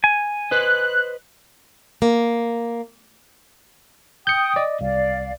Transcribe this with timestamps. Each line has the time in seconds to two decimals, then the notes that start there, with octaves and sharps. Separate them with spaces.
0.04 G#5
0.51 B4 C5 D#5 F#6
2.02 A#3
4.27 G5 D#6 G6 C#7
4.56 D5 D#5
4.81 C2 D5 F5